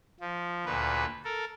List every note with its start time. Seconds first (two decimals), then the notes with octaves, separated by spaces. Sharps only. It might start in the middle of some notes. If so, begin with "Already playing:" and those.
0.20 F3
0.65 D2 A#2 B4
1.25 A4 A#4